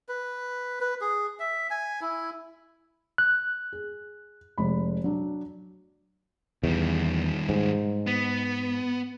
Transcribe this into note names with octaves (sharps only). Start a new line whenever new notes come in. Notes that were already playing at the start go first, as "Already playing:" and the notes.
B4
B4
G#4
E5
G#5
E4
F#6
G#4
F1 G#3 B5
F#3 D4
E2 D#3 G3
G#2
B3